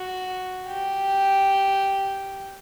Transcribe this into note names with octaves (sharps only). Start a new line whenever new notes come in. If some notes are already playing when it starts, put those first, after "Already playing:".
Already playing: F#4
G4